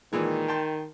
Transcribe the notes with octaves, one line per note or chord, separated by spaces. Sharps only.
A#2 D#3 E3 G#3
G5 A5 C6